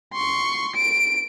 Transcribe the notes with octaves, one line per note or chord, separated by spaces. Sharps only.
C6 C#6
D7